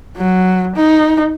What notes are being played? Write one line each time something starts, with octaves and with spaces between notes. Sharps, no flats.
F#3
D#4